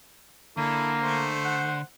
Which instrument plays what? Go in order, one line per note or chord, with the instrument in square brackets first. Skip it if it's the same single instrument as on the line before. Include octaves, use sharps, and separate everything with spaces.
[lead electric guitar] D3 [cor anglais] A#3 [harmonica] E4 A4
[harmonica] A3 C5
[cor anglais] F#5